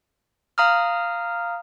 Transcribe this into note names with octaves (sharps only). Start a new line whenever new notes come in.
F5 A#5 D#6 F6